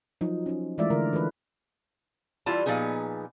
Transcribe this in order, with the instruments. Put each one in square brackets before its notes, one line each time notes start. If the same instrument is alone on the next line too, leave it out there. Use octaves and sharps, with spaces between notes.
[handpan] F3 F#3 D#4
C#4 D#4
E3 G#3 A3 F4 D5 E5
D3 A#4
E3 F4 A4 B4
[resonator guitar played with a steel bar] E3 G3 E4 F4 A5
A#2 F3 B3 D#4 G#4